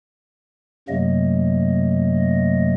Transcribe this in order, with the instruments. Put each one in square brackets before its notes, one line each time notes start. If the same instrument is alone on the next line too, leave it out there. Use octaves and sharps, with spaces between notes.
[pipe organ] F#2 C3 F#3 A3 A#3 D#5